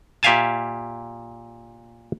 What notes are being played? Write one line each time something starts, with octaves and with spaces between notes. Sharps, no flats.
A#2 G4 E5 F5 G#5 A5